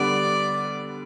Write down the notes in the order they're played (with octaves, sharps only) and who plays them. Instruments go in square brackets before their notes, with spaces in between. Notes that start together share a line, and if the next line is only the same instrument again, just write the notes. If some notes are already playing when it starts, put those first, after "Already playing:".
Already playing: [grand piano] D3 G3 B3 [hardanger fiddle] D5